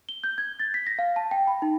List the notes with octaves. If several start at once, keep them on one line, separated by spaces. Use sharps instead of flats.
G7
G6
G#6
A6
B6
A#6
F5
A5
G5
B5
D#4